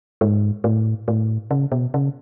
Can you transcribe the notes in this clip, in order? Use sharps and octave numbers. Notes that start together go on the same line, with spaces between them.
G#2
A2
A2
C#3
B2
C#3